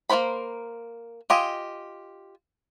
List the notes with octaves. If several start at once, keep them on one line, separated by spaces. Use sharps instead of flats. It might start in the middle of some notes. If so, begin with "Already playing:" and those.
A#3 F#4 A#4 C5 B5
F4 G4 D#5 G#5